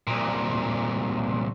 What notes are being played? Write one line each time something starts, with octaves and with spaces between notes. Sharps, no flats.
C2 A#2